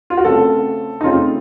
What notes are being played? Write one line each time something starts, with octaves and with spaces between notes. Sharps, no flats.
F4
F#4
C#3 A3 C4 A4
D#4
C#3 A3 C4 F4